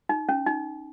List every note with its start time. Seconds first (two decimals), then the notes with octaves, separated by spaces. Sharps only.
0.09 D#4
0.29 C#4
0.46 D#4